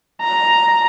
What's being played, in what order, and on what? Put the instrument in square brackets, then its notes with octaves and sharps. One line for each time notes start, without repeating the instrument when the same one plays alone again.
[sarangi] A#5